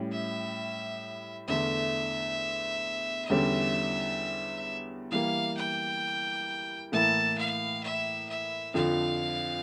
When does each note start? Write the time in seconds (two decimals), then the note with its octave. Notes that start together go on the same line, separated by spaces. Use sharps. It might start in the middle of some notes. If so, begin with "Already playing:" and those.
Already playing: A2 G3 C#4
0.12 E5
1.48 E2 D3 A3 E5
3.30 E2 D3 G3 C#4
5.11 E3 G3 A#3 F5
5.57 G5
6.92 A2 E3 A#3 E4 A5
7.38 F5
7.83 E5
8.29 E5
8.74 F2 D3 F3 F5